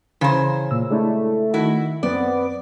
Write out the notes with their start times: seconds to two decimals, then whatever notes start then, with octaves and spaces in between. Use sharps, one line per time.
0.21 C#3 E3 C5 A#5 G#6
0.71 A#2 E6
0.91 G#3 A3 D4 E4
1.54 D#3 E4 F#4
2.03 F#2 B3 C4 D5